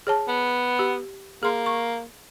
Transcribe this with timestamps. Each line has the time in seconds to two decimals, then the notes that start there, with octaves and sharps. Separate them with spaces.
0.07 G#4 C#5 A5
0.28 B3
0.79 G4
1.43 A#3 G#4 C6
1.66 C#6